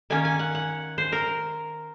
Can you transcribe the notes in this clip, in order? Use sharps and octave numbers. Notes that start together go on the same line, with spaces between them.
D#3 A#3 C#4 G#5
G#5
F#5
F#5
C5
A#4